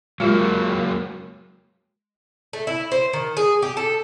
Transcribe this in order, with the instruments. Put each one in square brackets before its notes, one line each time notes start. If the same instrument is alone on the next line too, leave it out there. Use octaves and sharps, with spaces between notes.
[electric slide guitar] F#3 A#3 [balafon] G#3 F4 G4
[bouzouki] A3
E4
C5
D#3
G#4
G4
A4